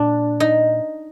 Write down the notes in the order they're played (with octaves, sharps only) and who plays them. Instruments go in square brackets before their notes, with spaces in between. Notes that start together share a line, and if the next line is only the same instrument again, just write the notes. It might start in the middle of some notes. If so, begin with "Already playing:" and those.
Already playing: [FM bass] A#2 [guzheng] D4
[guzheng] D#4